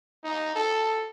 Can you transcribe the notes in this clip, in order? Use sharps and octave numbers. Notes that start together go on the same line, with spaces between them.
D#4
A4